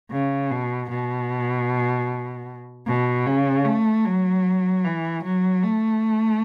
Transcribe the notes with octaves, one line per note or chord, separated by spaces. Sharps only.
C#3
B2
B2
B2
C#3
A3
F#3
E3
F#3
A3